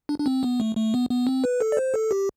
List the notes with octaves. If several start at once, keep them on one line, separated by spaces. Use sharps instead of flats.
D4
D4
C4
B3
A3
A3
B3
B3
C4
B4
A4
D5
C5
A4
G4